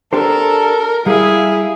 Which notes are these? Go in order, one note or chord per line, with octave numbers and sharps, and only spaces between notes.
D4 G4 A4 A#4 C5
G3 E4 G#4 F5